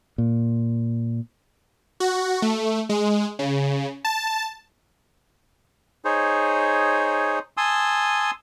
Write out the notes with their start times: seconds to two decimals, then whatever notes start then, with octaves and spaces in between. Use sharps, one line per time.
0.18 A#2
2.00 F#4
2.42 A3
2.89 G#3
3.39 C#3
4.05 A5
6.05 D#4 G#4 C5 C#5
7.57 G#5 A5 C6 D#6 E6